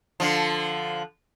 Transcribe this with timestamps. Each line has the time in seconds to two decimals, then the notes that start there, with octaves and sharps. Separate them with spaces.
0.20 D3 F3